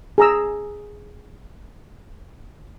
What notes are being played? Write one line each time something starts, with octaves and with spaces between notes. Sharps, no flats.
G#4 A#5 E6